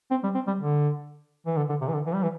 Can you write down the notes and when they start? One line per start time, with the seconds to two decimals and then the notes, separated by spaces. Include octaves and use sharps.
0.11 C4
0.23 G3
0.35 C4
0.47 G3
0.59 D3
1.46 E3
1.57 D3
1.69 D3
1.81 C3
1.88 E3
1.94 D3
2.06 E3
2.14 G3
2.23 E3